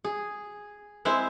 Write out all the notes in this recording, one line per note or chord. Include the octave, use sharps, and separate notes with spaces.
G#4
G#3 C4 E4 C5